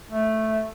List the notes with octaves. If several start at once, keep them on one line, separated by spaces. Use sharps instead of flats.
A3